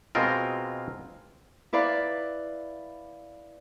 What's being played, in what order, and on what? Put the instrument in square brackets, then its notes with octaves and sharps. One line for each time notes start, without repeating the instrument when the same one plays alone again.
[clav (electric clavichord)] B2 G#3 C4 F4 A#4
[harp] E4 B4 D5 F5 B5